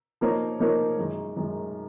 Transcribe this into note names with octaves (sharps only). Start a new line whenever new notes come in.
F3 A#3 D#4 A#4 C#5
F3 A#3 D#4 A#4 C#5
F#2 D#3 G#3
F#2 D#3 G#3